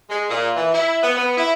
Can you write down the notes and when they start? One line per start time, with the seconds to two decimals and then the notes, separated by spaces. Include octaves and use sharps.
0.10 G#3
0.30 A#2
0.56 E3
0.74 E4
1.03 B3
1.17 B3
1.37 E4